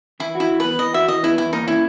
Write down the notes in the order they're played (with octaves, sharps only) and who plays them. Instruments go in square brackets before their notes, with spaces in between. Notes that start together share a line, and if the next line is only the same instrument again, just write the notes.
[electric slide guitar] E3 [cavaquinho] E4
[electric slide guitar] F#4
[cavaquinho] E4
[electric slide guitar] E3
[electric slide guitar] B3 [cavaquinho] B4
[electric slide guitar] E3 [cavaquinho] D#5
[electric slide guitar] F#4 [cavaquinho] E5
[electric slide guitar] E3 [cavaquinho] D#5
[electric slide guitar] B3 [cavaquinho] E4
[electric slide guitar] E2 [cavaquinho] E4
[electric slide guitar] A#3 [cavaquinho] D#4
[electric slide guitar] C#4 [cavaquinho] E4